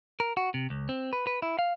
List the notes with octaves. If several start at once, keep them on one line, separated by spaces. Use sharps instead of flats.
A#4
F#4
C3
C#2
C4
B4
B4
E4
F5